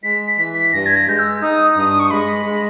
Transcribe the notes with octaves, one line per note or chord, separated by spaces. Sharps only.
G#3 B6
E3 B6
G2 A#6
G#6
A#6
G#3 G6
E6
D#4 D#6
G2 D#6
D#6
C#6
G#3 B5
G#3